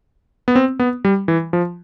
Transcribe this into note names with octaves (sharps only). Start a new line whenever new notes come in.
B3
C4
B3
G3
E3
F3